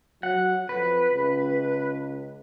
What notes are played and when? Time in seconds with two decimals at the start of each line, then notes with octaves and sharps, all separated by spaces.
0.23 F#3 F#5
0.69 F2 B4
1.14 C#2